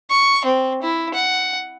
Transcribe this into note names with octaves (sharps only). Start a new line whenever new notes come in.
C#6
C4
E4
F#5